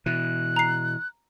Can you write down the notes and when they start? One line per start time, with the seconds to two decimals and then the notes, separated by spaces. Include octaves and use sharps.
0.06 B2 E3 F#6
0.56 A#5 C7